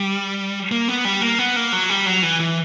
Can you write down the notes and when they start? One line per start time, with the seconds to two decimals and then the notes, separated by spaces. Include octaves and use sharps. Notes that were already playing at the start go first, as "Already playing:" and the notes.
Already playing: G3
0.72 A#3
0.88 B3
1.05 G3
1.21 A#3
1.39 B3
1.56 A#3
1.73 F#3
1.90 G3
2.06 F#3
2.23 E3
2.40 E3